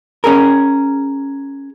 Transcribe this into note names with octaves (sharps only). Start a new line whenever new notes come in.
C#4 G#4 A#4